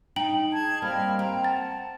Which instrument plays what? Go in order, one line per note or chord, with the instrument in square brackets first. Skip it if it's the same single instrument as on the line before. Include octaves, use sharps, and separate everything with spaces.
[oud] D#4 [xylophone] G5 F#7
[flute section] G#4 A5 G#6
[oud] G3 A#3 C4 [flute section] D#5 B5 F6
[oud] C4 [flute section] A#5
[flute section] F#5 A5 [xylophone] A6